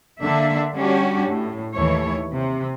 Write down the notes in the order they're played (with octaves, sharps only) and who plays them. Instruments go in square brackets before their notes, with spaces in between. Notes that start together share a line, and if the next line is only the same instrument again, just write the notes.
[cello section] D3 A#3 D4 E5
G3 C#4 D4 F#4 G4
A2
D#2 E3 A3 C#5
C3